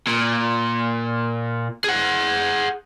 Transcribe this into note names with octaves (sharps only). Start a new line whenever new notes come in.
A#2
G#4 F#5